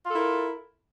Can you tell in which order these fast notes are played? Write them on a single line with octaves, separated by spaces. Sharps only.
F4 A4 E4 A#4